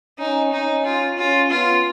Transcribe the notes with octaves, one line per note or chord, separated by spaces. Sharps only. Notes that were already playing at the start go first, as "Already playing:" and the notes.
C#4 D#4
C#4 D#4
F4
C#4 F4
B3 F4